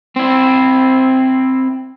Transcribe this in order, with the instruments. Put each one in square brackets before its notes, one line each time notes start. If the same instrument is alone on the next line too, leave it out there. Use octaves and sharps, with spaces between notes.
[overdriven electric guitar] C4 E4